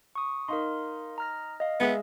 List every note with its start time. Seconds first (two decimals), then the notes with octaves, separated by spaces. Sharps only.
0.15 C#6 D#6
0.48 D#4 A#4 F5 C6
1.18 A#5 F6 A#6
1.60 D#5 F5
1.80 G#3 B3 E5